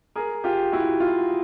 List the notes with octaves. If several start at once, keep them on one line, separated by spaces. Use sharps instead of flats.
G#4 A#4
F4 G4
E4 F#4
F4